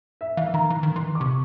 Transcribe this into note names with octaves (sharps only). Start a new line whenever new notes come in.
E5
E3 F5
D#3 A#5
E3
D#3
E3 C6
D6
C3 C#6